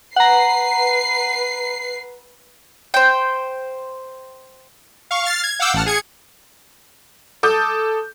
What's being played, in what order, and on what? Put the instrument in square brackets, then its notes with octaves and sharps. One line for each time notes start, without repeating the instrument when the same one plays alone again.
[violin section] B4 C7 [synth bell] F#5 A#5
[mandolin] C5 G5
[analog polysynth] F5 C#6
F6 A6 C7
G#6
F5 F#5 D6 E6 G6
A1 F#5 A5 F6
G#4 G#6 C#7
[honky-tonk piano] A4 A5 D6 D#6 G6